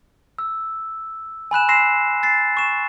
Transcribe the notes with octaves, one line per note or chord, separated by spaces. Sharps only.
E6
G#5 B5 F#6 E7
C6 E6 A#6 C7 E7
A6 C7
C#6 E7